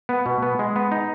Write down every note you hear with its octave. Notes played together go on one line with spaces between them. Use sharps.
B3
B2
B3
G#3
B3
D#4